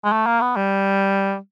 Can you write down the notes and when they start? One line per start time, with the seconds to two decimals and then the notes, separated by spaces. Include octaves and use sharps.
0.04 G#3
0.12 A3
0.26 A#3
0.41 B3
0.56 G3